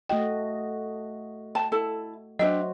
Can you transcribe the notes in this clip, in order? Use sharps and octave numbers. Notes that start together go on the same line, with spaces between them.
A3 F#4 D#5 G5
G5 A5
E4 A4 A5
F#3 D4 F#4 C5 D#5 E5 G5